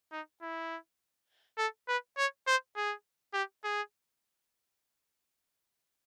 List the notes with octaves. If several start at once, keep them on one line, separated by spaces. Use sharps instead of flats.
D#4
E4
A4
B4
C#5
C5
G#4
G4
G#4